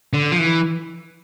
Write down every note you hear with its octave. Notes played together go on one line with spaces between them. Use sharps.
D3
F3
E3